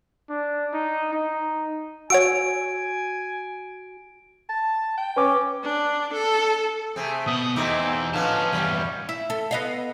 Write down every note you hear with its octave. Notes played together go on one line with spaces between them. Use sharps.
D4
D#4
D#4
F#4 C#5 F#5 G#5 E6 D7
A5
G5
C#4 B4 D6
D4
A4
C3 A3 C4 G#4
B2 B3 D#6
E2 B2 A3 C4 D#4 D6
D3 F3 C#4 B4 F5 A5
E2 G2 G3 F5
E4
A4
B3 D#5 F5